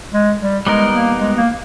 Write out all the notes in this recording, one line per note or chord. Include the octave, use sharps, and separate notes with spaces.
G#3
G3
G3 G#3 B3 D#4 A#4
A#3
G#3
A#3